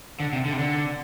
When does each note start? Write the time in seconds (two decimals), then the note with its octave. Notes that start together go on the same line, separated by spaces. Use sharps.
0.20 D3
0.33 C3
0.45 D3
0.53 C3
0.59 D3